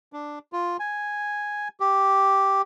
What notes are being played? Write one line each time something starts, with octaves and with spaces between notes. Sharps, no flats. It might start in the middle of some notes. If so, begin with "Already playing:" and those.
D4
F4
G#5
G4